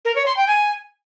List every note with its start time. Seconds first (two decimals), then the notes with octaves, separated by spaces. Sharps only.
0.05 A#4
0.16 C#5
0.26 C6
0.37 G5
0.47 G#5